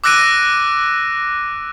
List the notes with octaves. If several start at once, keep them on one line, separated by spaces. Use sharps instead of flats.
D6 E6 F#6 A#6 D7 D#7